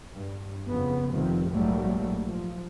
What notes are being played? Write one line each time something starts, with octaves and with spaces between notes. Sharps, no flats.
G2
F2 C#3 B3
F1 F2 C3 D#3 F3 G3
A#1 G#2 F#3 G3 A3 A#3
F3